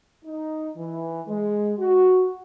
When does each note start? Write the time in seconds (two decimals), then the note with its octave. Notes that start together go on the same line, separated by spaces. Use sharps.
0.25 D#4
0.76 E3
1.28 G#3
1.78 F#4